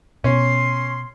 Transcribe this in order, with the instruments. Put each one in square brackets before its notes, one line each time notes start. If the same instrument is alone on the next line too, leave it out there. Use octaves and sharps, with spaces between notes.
[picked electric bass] B2 [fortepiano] C#4 [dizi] C6